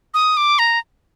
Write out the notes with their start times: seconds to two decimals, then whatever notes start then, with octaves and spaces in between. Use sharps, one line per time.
0.14 D#6
0.37 D6
0.59 A#5